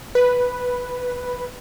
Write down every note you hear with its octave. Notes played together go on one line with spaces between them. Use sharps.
B4